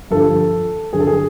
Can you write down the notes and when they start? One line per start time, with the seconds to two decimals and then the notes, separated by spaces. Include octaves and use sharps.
0.11 G2 D3 F3 A4
0.93 G2 D3 F#3 G#4
1.00 A4
1.07 G#4